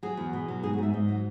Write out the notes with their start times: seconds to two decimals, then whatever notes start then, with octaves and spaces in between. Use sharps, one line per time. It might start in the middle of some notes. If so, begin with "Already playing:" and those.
0.03 F#3 G#4
0.17 E2
0.33 B2
0.48 F#3
0.63 G#2 G#4
0.73 F#4
0.78 G#2 E5
0.94 G#2 D#5
1.08 F#3